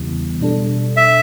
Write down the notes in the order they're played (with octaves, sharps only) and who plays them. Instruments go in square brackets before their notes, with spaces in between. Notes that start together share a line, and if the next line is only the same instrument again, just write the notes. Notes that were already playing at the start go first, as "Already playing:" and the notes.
Already playing: [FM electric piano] E2 C#3 E3 G3 B3
B2 G3 D4 A4
[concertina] E5